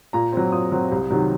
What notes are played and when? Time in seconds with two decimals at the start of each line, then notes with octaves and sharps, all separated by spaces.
0.13 A#2 A#5
0.33 F#3 C4
0.52 A#2 D#6
0.72 F#3 C4
0.92 C2
1.11 C3 D#3 F#3